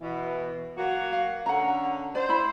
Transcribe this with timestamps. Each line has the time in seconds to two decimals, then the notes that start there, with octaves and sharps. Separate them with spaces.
0.01 B2 E3
0.78 F#3 A#3 F#4
1.13 F5
1.46 D3 C#4 F#5 A#5
2.15 C5 D5
2.29 E4 B5